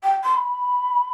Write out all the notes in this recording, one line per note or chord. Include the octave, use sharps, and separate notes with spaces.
G5
C6
B5